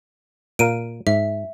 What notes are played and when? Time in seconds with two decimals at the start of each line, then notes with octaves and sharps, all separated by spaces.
0.59 A#2 A#4 F5 D7 D#7
1.07 G#2 E5